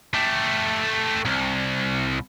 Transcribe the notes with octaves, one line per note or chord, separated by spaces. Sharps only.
A3 G4
C2